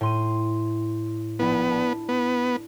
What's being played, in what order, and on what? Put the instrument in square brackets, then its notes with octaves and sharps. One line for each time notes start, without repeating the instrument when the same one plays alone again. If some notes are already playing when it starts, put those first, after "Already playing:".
[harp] A2 C6 D#7
[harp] A#1 D4 E4 [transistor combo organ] B3
[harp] A5
[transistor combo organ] B3